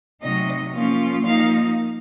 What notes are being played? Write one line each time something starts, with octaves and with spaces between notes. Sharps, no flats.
C3 F#3 A3 D#4 D#5
F3 A#3 C#4 F4
F3 A#3 D#4 F5